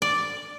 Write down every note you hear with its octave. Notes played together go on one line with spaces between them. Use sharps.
D5